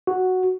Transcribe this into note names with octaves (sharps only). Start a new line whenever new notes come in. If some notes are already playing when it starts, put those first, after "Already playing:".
F#4